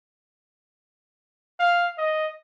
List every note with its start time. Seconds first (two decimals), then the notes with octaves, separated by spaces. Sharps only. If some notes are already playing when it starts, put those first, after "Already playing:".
1.60 F5
1.98 D#5